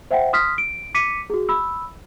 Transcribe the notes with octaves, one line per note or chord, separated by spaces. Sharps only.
C5 E5 F#5 G5
C6 D#6 F6 B6
D7
D6 B6 C#7 D#7
F#4 G#4
B5 E6